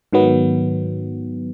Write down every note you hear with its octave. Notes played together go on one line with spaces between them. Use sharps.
G#2 D#3 F#3 B3